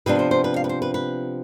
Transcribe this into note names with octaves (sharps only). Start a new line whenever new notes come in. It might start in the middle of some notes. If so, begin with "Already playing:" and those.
C3 F3 B3 D4 B4
C5
C5
B4
F5
B4
C5
B4
B4